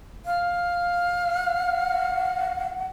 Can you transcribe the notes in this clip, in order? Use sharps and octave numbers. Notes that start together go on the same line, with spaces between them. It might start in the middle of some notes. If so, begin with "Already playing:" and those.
F5
F#5